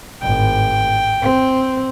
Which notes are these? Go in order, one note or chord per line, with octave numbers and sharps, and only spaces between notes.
G#1 A2 G5
C4